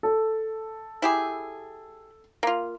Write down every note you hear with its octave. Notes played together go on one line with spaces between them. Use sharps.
A4
E4 G4 G#4
A#3 F4